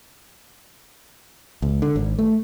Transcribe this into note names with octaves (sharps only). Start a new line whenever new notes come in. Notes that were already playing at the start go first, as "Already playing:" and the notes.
C#2
D3
G#1
A3